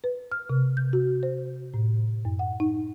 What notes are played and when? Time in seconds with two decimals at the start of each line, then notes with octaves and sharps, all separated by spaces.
0.04 B4
0.32 F6
0.49 C3
0.77 G6
0.93 F#4
1.23 C5
1.74 A2
2.25 F#2
2.39 F#5
2.60 D#4